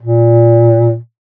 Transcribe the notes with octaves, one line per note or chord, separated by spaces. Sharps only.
A#2